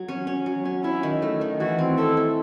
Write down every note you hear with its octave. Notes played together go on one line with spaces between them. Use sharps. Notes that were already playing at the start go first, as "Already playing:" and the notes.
Already playing: F#3
C#4
C#4
F#3
C#4
C#4 E4
D#3
A3
D#3
E3 F#4
C4
E4 A4
E4